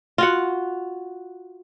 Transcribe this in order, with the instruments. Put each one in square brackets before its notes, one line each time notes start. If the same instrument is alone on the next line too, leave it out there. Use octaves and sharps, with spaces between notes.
[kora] F4 F#4 F#5